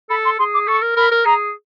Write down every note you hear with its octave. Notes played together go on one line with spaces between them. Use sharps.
A4 B5
C6
G#4 C6
D6
A4 C#6
A#4
A#4 B5
A#4
G#4 A#5